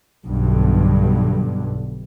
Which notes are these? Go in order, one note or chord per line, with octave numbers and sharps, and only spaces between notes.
B1 G2 D3